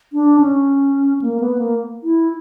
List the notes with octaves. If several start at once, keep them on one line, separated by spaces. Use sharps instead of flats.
D4
C#4
A#3
B3
A#3
E4